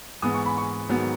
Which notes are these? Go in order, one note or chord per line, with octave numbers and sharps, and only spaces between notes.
G#2 E3 G#3 B3 D#6
C#6
B5
C#6
G#2 D#3 F#3 B3